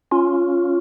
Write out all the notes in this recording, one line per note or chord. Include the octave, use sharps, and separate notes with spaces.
C#4 F4